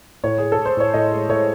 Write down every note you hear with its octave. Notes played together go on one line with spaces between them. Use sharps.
A2 C#5
A2 G#4
A4
A2
C5
A2 C#5
A2 D#5
G#3
A2 C#5